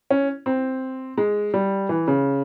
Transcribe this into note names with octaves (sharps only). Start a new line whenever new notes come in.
C#4
C4
G#3
G3
E3
C#3